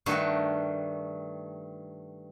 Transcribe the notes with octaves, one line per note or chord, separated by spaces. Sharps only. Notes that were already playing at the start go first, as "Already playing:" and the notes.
G2 D#3 G3 A3 F#4